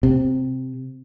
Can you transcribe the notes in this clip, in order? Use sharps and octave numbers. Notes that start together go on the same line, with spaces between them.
C3